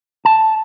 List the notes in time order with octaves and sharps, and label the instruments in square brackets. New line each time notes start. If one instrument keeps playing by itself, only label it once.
[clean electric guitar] A5